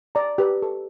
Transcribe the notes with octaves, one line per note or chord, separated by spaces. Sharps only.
D5 A#5
G4 B4
A4